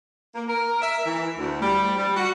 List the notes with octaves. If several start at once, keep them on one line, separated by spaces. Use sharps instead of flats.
A#3
A#4
E5
E3
D2
G3
G3
F#4